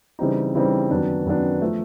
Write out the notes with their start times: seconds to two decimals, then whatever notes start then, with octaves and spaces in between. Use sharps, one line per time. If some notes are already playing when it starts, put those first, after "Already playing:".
0.19 C#3 E3 G3 C4 D#4
0.55 C#3 E3 G3 C4 D#4
0.91 F#2 D#3 F#3 B3 D4
1.26 F#2 D#3 F#3 B3 D4
1.62 F3 A3